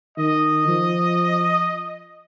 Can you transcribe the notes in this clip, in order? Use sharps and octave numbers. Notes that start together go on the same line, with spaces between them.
D#3 D#5
F3